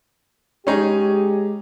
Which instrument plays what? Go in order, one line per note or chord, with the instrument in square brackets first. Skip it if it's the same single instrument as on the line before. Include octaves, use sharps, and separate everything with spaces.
[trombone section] G#3 G4 [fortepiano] C#4 D#4 G#4